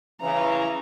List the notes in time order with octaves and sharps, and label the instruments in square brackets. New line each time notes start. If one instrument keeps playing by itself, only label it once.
[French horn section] C#3 E3 [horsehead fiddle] A#5